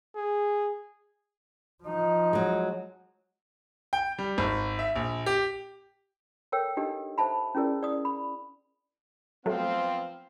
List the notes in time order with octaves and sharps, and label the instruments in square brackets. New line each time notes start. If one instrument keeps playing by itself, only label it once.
[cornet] G#4
[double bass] F3 D#4
[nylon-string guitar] F#3 G#3
[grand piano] G5
G3
G#1
E5
A#1
G4
[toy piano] A4 A#4 C#5 G5 E6
D4 D#4 G4 A4 D#5
A4 C5 E5 A5 B5
C#4 E4 G#4 A#4 D5
D5 D#6
B5
[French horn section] F3 B3 C4 [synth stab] F#3 A3 [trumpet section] F5